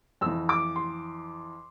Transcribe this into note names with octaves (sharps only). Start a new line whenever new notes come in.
F2 E3 E6
D6
C6